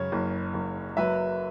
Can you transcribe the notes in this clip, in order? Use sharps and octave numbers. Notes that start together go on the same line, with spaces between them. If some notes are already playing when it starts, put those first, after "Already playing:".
Already playing: F#2 C#3 C#5
F#1
F#1
F#3 B4 E5